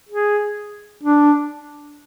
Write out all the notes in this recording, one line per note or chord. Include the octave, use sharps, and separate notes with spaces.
G#4
D4